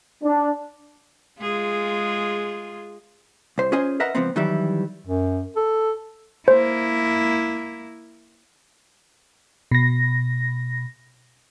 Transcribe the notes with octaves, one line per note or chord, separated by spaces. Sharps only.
D4
G#3 F4 G#4
C2 C5
C#4 F4 G#4 C5 D#5 G#5
A#4 B4 D#5 E5 F#5 A#5
C#2 G#2 F3 B3 C4
D#3 E3 F#3 G3 E4
F#2
A4
A#3 E4 C5
B2 A#6